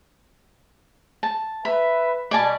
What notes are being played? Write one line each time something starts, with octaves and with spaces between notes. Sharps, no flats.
A5
B4 E5 B5
B2 G3 D5 G#5 A5